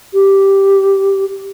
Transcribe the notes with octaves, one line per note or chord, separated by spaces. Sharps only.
G4